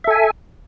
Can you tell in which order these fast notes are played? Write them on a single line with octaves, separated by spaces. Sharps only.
E5 A4 G#5